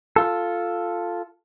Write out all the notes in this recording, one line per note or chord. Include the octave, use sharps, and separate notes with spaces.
F4 A4